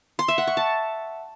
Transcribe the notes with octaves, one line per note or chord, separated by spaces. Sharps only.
C6
E5
F#5
C#6
A5